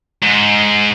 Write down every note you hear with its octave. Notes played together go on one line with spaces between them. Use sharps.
G#2